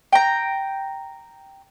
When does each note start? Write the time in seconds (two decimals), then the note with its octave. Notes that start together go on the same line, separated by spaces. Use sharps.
0.13 G5 A#5